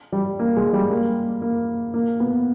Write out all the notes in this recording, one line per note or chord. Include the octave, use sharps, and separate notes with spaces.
G3
A#3
G#3
G3
A#3
A#3
A#3
B3